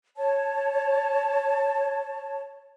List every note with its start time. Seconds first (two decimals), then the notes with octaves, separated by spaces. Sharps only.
0.16 C#5 A5